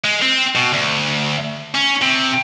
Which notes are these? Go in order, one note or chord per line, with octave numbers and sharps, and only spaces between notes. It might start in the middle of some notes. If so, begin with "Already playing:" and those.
G#3
C4
B2
D2
C#4
C3